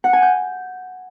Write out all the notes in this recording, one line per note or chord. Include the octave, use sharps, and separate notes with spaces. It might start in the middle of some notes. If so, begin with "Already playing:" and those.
F#5
G#5
G6